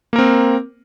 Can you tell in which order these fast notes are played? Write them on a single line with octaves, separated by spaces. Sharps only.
A#3 A#4 C4